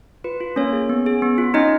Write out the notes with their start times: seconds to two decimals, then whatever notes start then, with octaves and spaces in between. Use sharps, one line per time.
0.24 F4 B4
0.41 F4
0.56 A#3 C#4 C#5
0.73 G#4
0.89 B3
1.06 G#4
1.22 B3
1.38 F4
1.54 C#4 D#4 D#5